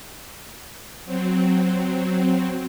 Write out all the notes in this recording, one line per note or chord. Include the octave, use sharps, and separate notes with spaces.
F#3 C4